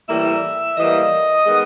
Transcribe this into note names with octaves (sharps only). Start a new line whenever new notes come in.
A2 E3 G3 A#3 E5
A2 E3 G3 A#3 D#5
D#3 G#3 B3